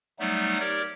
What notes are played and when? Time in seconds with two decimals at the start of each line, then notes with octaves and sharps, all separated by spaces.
0.19 F#3 G3 A3 B3 D#4
0.60 G4 A#4 C#5 D5